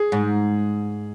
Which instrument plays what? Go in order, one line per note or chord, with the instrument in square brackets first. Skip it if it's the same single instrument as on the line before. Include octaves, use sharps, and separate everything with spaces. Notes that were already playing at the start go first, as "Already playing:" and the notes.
Already playing: [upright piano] G#4
[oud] G#2